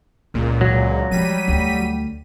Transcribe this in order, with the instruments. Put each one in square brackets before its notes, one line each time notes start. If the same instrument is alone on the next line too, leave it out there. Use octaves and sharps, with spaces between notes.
[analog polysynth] C#2 A#2 [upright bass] E4
[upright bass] D3 [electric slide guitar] F#3
[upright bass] F3 G#3 [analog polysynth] G3 B6 D#7
[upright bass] D2